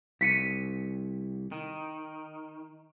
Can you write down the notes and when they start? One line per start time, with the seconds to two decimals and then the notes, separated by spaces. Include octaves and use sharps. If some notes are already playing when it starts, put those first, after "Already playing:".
0.21 C2 B6 C#7 D#7
1.52 D#3